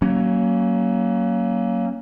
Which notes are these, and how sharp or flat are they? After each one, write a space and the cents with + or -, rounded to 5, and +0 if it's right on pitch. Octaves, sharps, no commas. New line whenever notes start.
F#3 +25 A#3 +0 C#4 +0